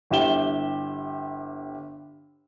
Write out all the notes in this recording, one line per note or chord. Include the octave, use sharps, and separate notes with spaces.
G1 E4 G4 E7 G7